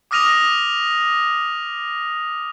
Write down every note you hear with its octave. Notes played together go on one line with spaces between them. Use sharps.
D6 D#6 F6 A#6 D#7 F7